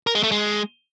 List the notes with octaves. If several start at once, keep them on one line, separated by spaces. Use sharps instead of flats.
A#4
G#3
A3
G#3